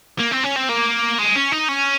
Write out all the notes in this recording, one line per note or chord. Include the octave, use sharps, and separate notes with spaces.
A#3
C4
C#4
C4
A#3
G#3
C#4
D#4
C#4